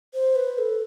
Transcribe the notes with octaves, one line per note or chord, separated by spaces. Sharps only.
C5
B4
A4